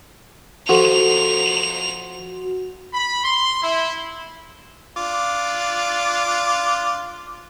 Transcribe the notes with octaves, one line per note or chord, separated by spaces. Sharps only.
F3 F#4 A4 F7
B5
C6
E4
D4 F4 D6